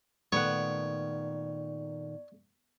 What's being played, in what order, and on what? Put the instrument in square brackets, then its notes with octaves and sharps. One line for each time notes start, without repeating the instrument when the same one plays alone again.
[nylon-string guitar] A#2 D#3 A3 [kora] B3 F#5 [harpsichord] C#5 [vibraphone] D5